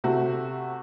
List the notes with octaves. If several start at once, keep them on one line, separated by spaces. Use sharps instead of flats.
C3 A3 F#4